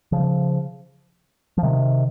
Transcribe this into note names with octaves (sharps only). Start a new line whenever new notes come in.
C#3 F3
F3
C3 D#3